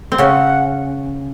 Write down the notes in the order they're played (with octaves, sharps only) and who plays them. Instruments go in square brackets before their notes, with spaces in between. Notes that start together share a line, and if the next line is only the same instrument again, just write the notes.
[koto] C4
[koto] C#3 C#4 [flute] F#5